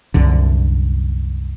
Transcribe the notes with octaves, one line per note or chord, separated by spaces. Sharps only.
C2 F#2 D3